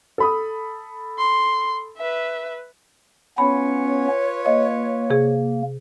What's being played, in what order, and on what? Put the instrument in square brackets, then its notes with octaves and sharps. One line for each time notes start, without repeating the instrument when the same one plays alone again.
[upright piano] A4 B5 D#6
[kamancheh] C6
B4 E5
[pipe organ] B3 C#4 [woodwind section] F4 B4 C#5 [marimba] B5
[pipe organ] A#3 [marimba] D#5
[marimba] C3 G#4